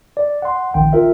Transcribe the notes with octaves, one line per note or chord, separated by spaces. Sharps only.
D5
F#5 C6
A#1 D#3 G5
F4 A#4 E5